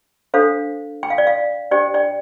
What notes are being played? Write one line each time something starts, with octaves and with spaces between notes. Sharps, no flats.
D4 A4 C5 F5
G5
F5
D5
F5
D4 G4 C5 D5 G5
D5 G5